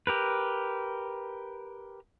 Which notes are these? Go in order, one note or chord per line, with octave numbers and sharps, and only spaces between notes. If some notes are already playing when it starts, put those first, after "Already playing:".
G4 A#4 B4